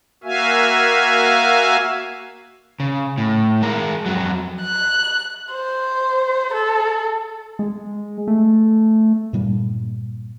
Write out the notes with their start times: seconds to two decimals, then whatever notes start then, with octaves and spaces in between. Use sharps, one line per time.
0.24 A#3 F#4 E5 F5 G#5
2.80 C#3
3.18 A2
3.62 G#3 A#4
4.06 F2 F#3
4.61 F#6
5.52 C5
6.53 A4
7.59 G#3
8.28 A3
9.33 G2 A#2 G3 A#3